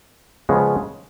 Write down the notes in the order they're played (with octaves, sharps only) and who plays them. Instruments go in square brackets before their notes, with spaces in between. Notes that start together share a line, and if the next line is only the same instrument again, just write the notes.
[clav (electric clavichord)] C#3 F3 G#3 B3